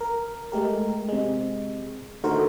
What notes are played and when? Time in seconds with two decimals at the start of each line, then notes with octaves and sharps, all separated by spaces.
0.01 A#4
0.52 G#3 A3 G4 A#4
1.09 C3 G#3
2.23 D3 D#3 A3 F#4 A#4 C5